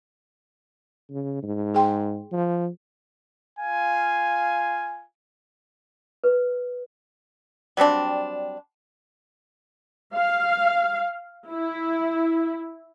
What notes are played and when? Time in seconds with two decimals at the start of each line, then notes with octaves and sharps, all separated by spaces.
1.10 C#3
1.43 G#2
1.74 G#4 G5 C6
2.32 F3
3.60 F4 F5 G#5
6.24 B4
7.77 F#3 G3 C4 D4
10.17 F5
11.51 E4